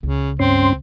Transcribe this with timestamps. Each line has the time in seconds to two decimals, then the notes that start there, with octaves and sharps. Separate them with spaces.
0.03 C#2 C#3
0.39 G2 C4 C#4 C6